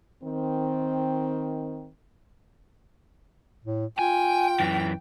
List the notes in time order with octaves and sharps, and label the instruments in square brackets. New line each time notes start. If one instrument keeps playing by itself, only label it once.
[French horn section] D#3 C4
[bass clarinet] A2
[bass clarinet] F4 [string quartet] G5 [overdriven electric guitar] G#5
[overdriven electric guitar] F#2 E3